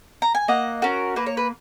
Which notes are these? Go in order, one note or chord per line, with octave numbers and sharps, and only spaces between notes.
A#5
G#5
A#3 D#5 F#5
C#4 F#4 A#4
A#3 B4
C#5
B4